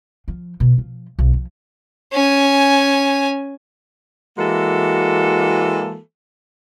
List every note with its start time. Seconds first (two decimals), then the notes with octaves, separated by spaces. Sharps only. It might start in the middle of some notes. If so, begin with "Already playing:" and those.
0.28 F3
0.60 B2
0.78 F3
1.19 B1
1.33 F3
2.12 C#4 G#5
4.38 E3 G#3 A#3 F#4 A4